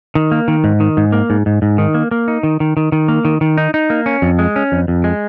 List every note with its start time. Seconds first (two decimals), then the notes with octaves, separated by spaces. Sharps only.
0.15 D#3
0.32 A#3
0.48 D#3
0.64 G#2
0.80 D#3
0.97 G#2
1.12 A#3
1.30 G#2
1.46 G#2
1.62 G#2
1.78 D#3
1.94 A#3
2.11 A#3
2.28 D#4
2.43 D#3
2.60 D#3
2.77 D#3
2.92 D#3
3.08 A#3
3.25 D#3
3.41 D#3
3.58 D#4
3.74 D#4
3.90 A#3
4.06 C#4
4.22 F2
4.39 G#3
4.56 C#4
4.72 F2
4.88 F2
5.04 G#3